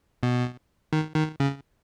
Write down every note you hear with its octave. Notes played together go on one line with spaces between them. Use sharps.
B2
D#3
D#3
C#3